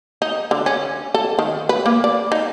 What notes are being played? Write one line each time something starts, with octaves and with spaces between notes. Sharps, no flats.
D#4
D3
C#4
A4
D#3
B4
A#3
D5
D#4